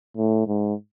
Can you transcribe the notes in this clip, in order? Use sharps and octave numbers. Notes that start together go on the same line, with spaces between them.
A2
G#2